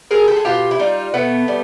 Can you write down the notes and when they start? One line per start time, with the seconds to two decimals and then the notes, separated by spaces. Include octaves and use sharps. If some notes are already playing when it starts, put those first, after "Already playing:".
0.11 G#3 G#4 A#4
0.28 G4 A4
0.36 G#4
0.45 B2 F4 G4
0.71 E4
0.79 G3 D#4 F4
1.14 B2 A3 B3
1.48 G3